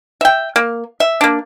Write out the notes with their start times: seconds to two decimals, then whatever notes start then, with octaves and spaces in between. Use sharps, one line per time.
0.21 E5 G5
0.56 A#3
1.00 E5
1.21 A#3 D4